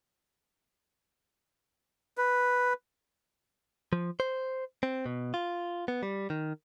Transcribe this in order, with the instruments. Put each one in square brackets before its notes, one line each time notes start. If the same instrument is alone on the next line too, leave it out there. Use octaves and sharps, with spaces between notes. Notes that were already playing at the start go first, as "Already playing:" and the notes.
[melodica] B4
[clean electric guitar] F3
C5
C4
B2
F4
B3
G3
D#3